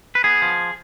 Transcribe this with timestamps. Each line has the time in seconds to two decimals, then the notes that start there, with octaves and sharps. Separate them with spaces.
0.15 B4
0.24 B3 G#4
0.42 F3